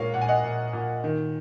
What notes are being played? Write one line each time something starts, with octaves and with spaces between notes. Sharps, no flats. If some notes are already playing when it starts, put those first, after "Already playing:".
Already playing: A#2 G#3 A#4 C#5 F5
A#2 F#5
G#5
D#5 F#5
A#2
A#2
D#3